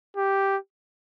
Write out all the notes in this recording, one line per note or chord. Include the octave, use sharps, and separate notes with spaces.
G4